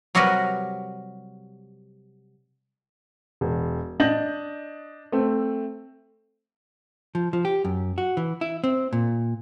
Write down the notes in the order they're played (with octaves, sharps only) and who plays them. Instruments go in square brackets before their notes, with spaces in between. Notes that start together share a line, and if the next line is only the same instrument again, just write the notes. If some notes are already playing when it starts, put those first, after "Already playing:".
[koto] C3 F#3 G3 F#4 A#4 B4
[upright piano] E1
D4 D#5 G6 A#6 F#7
A3 C4
[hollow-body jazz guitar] F3
F3
G4
F#2
F#4
E3
E4
C4
A#2